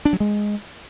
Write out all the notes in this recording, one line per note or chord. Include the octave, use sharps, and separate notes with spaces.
D4
F#3
G#3